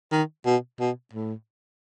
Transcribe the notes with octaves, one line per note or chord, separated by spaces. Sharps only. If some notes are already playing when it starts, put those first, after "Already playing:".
D#3
B2
B2
A2